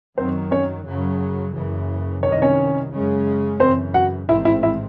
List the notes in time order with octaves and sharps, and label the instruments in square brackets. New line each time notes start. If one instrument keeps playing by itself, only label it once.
[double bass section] F#2 D#3 F#3 [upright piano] C4 C5
[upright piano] C#4 C#5
[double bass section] F#2 C#3 F#3
F#1 F#2 C#3 E3
[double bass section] C2 C3 D#3 [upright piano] C#5
[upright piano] D#5
C#4 C#5
[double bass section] F#2 C#3 G#3 C#4
[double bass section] F#2 C#3 E3 [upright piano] C4 C5
[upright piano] F#4 F#5
[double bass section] A1 G#2 D#3 G#3 C4 [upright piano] E4 E5
[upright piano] E4 E5
E4 E5